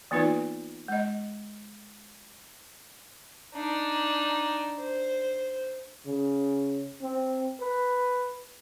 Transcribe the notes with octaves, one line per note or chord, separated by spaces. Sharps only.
E3 A#3 B3 D#4 F4 B4
G#3 D#5
D4 D#4
C5
C#3
C4
B4